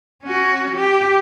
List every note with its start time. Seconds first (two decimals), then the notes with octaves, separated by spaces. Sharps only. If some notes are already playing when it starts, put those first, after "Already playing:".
0.23 C#4 F#4
0.76 G4